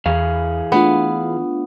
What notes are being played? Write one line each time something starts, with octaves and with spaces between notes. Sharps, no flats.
E2 E3 G#4 F5
A3 B3 D4 F4